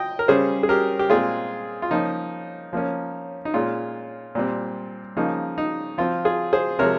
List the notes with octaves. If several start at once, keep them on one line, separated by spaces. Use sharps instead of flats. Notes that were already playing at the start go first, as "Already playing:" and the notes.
Already playing: D#5 G5
A#4
C#3 G3 C#4 G#4 C5
G#4
G4 A#4
G4
A#2 G#3 C4 F4 G#4
F4
F3 A#3 C#4 D#4
F3 A#3 C#4
D#4
A#2 G#3 C#4 F4
A#2 G3 C4
C#3 F3 A#3 D#4
D#4
F3 C4 F4
F4 G#4
G#4 C5
C3 F3 G#3 A#4 C#5